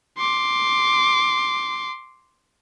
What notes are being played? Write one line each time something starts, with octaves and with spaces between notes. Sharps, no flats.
C6 D6